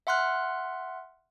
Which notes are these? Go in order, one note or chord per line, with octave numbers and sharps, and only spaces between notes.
E5 F#5 C6 F6 F#6